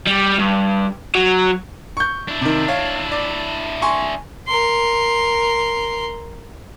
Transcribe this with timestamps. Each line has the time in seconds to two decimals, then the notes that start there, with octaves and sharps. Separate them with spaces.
0.07 G3
0.39 G2
1.15 F#3
1.97 C#6 G6
2.28 D4 E4
2.41 C3 D#3
2.68 C#5 F5
3.12 D5
3.82 G#5 C6 C#6
4.47 A#4 C6